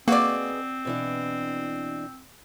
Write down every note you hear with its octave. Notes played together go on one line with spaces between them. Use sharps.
A#3 C4 F#4 G#4 B4 D5 D#5
B2 E3 D4